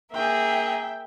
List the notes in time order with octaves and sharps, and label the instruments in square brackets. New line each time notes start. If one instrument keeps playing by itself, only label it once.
[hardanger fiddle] A#3 G#4 [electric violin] E5 G5